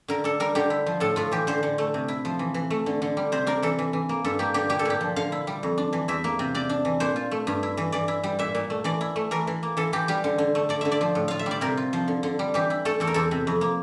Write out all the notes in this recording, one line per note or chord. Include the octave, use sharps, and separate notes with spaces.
D3 A#4
D4 A4
G3 A#4
D3 G4
E4
F3
A2 A4
A2 F4
E3 G4
D3 C5
D3
A3
C3
E4
F3
E3
E3
A3
D3
D3
G3
C3 C5
D4 A#4
E3 A4
E3
E3
A#3
G2 A4
A#3 G4
D3 G4
A#2 G4
A4
A#2 G4
F3
D3 F5
E4
G3
F2
D4
E3
E2 E5
A#3
C3
C3 D5
D4
E3
A#2 C5
F4
A3
G2
E4
E3
E3 D5
E4
G3
A#2 E5
A#2
A3
E3 D5
E4
A3
E3 A#4
E3
A#3
E3 A4
E3 G4
G3 G4
D3
D3
A3
D3 D5
D3 E5
D5
F3
A2
F4 F5
E5
G3 D5
C3 A#4
F4
F3
D3
D3
G3
E3 G4
E4
A3 A4
E2 A4
A#4
E2 A4
C3
F2
A#3